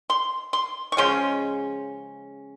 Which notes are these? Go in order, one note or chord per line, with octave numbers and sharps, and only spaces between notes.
C6
C6
C#6
C#3 F3 G#3 C#4 C6